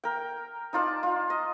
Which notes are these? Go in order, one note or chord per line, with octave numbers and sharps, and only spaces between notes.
A#4 G5
D#4 F4 D5 A5
F4
D#5